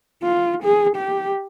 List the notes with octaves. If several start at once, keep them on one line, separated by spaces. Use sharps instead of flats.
F4
G#4
G4